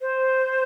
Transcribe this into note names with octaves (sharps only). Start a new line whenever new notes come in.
C5